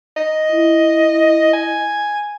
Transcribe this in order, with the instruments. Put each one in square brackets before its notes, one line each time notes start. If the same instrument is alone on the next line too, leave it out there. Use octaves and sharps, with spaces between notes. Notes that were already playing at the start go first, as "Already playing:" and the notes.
[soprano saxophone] D#5
[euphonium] E4
[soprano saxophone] G#5